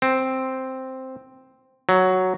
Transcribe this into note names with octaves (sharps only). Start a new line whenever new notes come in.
C4
F#3